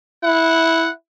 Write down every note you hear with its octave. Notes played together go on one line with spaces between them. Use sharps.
E4 F#5